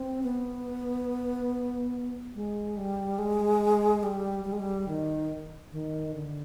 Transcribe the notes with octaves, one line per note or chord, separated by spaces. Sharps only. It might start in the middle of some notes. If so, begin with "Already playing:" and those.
Already playing: C4
B3
G#3
G3
G#3
G3
G3
G#3
G3
D#3
D#3
D3